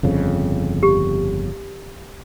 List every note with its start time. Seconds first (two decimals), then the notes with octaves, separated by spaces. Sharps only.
0.03 G1 F2 C#3
0.83 G4